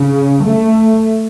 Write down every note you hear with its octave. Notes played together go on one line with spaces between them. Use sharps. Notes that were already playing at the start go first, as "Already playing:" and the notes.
Already playing: C#3
A3